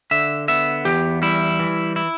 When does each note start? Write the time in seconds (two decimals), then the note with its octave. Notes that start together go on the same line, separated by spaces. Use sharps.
0.11 D3 E5
0.48 B3 E5
0.85 E2 G4
1.22 G3 E4
1.59 E3
1.96 E4